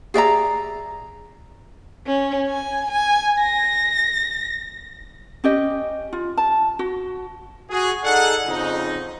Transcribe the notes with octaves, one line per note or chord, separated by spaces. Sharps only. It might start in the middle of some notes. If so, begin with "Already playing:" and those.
G#4 D5 E5 A#5
C#4
G#5
G#5
A#6
C#4 G4 D#5
F4
A5
F#4
F#4 G#4
D#4 G#4 A4 D5 F#5
F2 C#3 F3 D#4